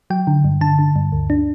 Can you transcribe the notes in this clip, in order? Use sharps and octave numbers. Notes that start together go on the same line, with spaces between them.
F#3 G5
D3
G2
D3 A5
D3
G2
D2
D4